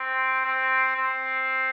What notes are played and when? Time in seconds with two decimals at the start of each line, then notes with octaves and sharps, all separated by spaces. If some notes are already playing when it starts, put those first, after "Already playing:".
Already playing: C4
0.45 C4
0.97 C4